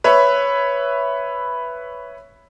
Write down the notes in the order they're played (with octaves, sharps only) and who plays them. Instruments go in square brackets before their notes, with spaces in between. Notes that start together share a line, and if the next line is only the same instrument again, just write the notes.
[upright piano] B4 C#5 E5